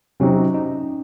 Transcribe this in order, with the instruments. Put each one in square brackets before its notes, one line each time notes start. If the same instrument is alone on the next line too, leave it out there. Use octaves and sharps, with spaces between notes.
[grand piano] C3 F#3 C4 D#4 F#4 [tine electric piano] C#4
[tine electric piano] D#4